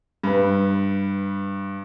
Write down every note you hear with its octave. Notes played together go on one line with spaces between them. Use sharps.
G2 B4